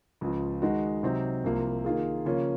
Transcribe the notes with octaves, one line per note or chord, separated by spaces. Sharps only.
C#2 C#3 F3
D#3 G#3 D#4 F#4
C3 F#3 C4 D#4
C2 C3 F3 A#3
D#3 A#3 F4 G#4
C#3 F3 A#3 C#4 F4